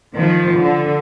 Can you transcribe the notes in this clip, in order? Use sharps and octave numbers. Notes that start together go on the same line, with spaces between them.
D#3 F3
D3